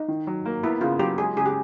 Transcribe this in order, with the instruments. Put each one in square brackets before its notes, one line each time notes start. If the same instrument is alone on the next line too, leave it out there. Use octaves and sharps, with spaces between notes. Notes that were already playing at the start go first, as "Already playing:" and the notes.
Already playing: [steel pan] D#4
[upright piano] D#3
F#3
A#3
[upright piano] B3 [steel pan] E4
[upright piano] C#3 [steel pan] F4
[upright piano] F#3 [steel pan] G4
[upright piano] G#3 [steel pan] G#4
[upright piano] C#3 [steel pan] G#4
[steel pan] G4